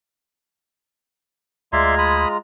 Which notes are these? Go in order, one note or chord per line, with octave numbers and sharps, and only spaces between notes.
D2 G#3 F4 D5 E5 A#5 C6 G#6
B5 D#6